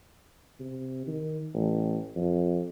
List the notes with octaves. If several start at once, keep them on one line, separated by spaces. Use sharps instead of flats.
C3
D#3
A1
F2